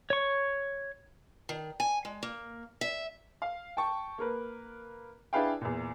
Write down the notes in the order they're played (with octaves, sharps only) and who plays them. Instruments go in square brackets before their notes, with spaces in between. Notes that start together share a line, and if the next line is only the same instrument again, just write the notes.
[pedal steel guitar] C#5 C#6
[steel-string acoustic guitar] D#3
G#5
G#3
A#3
E5
[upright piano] F5
G5 A5 C#6
A#3 A#4 B4
D4 E4 G#4 B4 F5 G5
E2 A#2